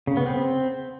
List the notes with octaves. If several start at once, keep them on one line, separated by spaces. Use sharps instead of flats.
C#3
B3
C4